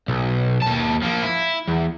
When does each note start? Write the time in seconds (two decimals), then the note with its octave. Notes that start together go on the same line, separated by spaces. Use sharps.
0.08 B1
0.62 D#2 A5
1.02 F3 A#3
1.22 E4
1.67 E2